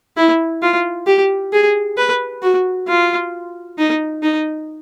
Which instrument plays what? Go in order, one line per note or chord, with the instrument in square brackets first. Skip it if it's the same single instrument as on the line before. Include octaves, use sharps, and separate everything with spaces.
[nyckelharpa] E4
F4
G4
G#4
B4
F#4
F4
D#4
D#4